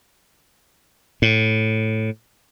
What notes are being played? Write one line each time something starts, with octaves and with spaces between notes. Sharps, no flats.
A2